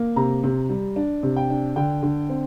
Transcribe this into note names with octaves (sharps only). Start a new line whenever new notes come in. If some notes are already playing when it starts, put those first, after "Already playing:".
Already playing: A#3
C3 A#5
C3
G3
D4
C3
G5
D4
D3 G5
D3
C4